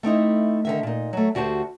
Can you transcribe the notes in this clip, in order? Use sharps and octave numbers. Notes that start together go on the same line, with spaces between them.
A3 C4 D#4 E4
D3 D#3 E5
A#2 D#4
F#3 A3
D2 F#4 G4 C5 A5